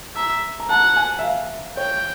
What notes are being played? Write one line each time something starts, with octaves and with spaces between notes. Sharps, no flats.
E5 A#5
A#5
F#5 A5
G#5
E5
F5
C#5 G5